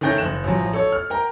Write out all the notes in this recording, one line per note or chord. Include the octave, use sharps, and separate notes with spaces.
D#3 A3 C#4 G5 G6 A#6
F#1 F#6 E7
A1 F3 F#3
A4 C#5
F6
A#4 G5 A#5